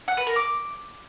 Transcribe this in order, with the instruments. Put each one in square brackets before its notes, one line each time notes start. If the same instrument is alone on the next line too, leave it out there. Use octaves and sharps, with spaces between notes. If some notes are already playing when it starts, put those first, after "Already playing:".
[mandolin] F#5
B4
A#4
D6